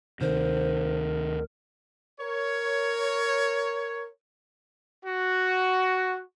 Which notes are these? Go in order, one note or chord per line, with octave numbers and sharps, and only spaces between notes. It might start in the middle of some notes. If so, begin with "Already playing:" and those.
D2 C3 D#3 A#4 C5
A#4 C#5
F#4